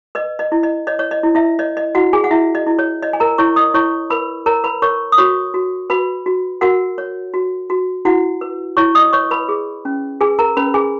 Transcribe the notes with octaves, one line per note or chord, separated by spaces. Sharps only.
B4 D#5
D#5
E4
D#5
C#5 D#5
C#5
D#5
E4
E4 E5
C#5 D#5
D#5
E4 F#4 F#5
G#4 G#5
F#5
E4 E5
D#5
E4
C#5
C#5 D#5
G#5
A#4 A#5
E4 C#5 C#6
D#5 D#6
E4 C#5 C#6
A#4 B4 B5
A#4 C#5 A#5
B4 B5
A#4 C#5 C#6
D#6
F#4 C#5 C#6
F#4
F#4 B4 B5
F#4
F#4 A#4 F#5
C#5
F#4
F#4
E4 F#4 F#5
B4
E4 C#5 C#6
D#5 D#6
B4 C#5 C#6
B4 B5
G#4
C#4
G#4 B4 G#5
A#4 A#5
C#4 B4 B5
G#4 G#5